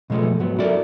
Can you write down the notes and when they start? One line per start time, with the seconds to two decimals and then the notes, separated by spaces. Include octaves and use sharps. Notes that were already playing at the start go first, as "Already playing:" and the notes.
0.10 B2 F3 G#3 A3 B3
0.39 G#2 F#3 B3
0.59 E4 F#4 A4 A#4 D5